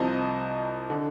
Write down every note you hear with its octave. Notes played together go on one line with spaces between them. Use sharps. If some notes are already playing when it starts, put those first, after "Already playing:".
Already playing: C2 C3 F3 C5 D#5
D3